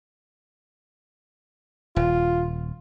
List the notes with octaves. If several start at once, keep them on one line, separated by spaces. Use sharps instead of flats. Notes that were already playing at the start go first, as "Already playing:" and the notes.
D#1 F4